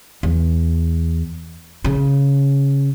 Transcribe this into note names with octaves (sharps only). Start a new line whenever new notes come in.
E2
C#3